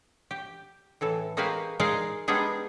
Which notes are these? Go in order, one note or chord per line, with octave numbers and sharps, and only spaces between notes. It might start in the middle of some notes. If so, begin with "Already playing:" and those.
G4
A2 E3 A4
G#3 A#3 F#4 G4 B4 F5
G#3 D#4 G#4 A#4 D5 F5
G3 G#3 B3 D4 D#4 G#4